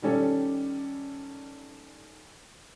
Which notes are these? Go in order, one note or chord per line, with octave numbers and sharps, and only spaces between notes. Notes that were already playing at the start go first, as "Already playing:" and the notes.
D#3 G3 C#4 A4 D5